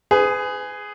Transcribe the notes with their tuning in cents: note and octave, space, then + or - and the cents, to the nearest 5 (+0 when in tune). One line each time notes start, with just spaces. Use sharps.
G#4 +0 B4 +35